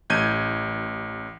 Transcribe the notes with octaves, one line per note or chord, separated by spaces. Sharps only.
A1 G6 G#6 D#7